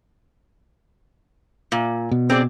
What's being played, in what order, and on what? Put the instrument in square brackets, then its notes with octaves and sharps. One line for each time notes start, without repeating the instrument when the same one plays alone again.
[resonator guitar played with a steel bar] A#2
[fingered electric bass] B2
[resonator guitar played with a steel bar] C4 G#4 D5